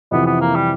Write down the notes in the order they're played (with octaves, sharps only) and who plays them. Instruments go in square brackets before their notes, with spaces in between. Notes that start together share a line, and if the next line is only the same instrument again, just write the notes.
[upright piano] F2 C3 E3 [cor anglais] B3
[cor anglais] B3
A#3
G3